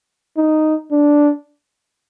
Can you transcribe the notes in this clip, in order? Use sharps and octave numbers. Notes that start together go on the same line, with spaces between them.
D#4
D4